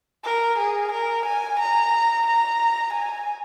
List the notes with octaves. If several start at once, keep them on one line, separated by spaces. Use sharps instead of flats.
A#4
G#4
A#4
G#5
A#5
A#5
G#5